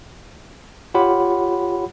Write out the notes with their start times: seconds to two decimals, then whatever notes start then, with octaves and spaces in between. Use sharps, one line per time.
0.94 F4 G4 C#5 F#5 B5